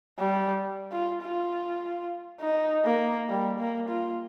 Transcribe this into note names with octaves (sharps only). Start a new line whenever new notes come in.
G3
F4
F4
D#4
A#3
G3
A#3
F4